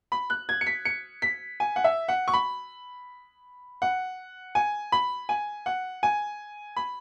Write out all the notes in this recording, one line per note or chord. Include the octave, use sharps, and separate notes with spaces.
B5
F#6
G#6
C#7
B6
C#7
B6
G#5
F#5
E5
F#5
C#6
B5
F#5
G#5
B5
G#5
F#5
G#5
B5